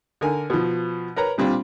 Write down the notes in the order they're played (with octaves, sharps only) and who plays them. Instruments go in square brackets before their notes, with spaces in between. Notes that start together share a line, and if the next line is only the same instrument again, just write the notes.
[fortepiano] D3 A#4 G#5
B2 F3
A#4 B4 C#5 A#5
A#2 G3 C4 D4 F4